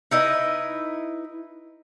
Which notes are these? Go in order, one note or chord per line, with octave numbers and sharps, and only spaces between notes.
D#4 E4 B4 D#5